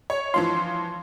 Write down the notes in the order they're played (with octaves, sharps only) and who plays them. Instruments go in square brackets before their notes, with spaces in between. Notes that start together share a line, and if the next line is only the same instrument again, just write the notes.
[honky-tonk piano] C#5
[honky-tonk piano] E3 F3 F4 [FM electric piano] C6